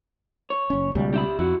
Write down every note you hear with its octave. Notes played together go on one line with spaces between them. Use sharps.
C#5
F#1 C#4
C#2 B2 G3
G4 E5 B5
F2 E4 F#4